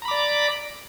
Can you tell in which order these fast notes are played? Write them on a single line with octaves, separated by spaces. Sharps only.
A#5 B5 D6 D5